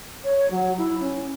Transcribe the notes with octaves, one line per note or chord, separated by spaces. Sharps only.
C#5
F#3
E4
C#4